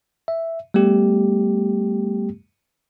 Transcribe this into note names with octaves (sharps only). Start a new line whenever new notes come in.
E5
G3 A3 B3 G4